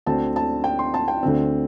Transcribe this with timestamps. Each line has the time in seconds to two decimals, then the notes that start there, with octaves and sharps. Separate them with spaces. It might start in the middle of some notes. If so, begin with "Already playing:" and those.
0.06 D2 D3 C4 A5
0.36 A5
0.64 G5
0.79 C6
0.94 A5
1.08 G5
1.23 D2 D3 C4